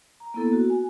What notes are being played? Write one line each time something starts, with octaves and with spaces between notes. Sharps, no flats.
A#5
A#3 B3 E4 A4
F#4
G#5